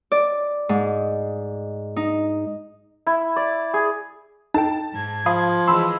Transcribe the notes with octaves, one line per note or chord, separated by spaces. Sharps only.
D5
G#2
D#4
E4
D5
G#4
D#4 A4 G5 A5
G#2 G#6
F3 F5 B5 D#6
E3 G#3 B5 C6 E6